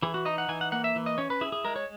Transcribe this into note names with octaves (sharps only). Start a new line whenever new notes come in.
E3 G#4
F#4
D#4 D#5
F#5
E3 G#5
F#5
A#3 F#5
E5
E3
D#5
C#4 C#5
B4
E4 G#4
G#4
G#3 A#4
C#5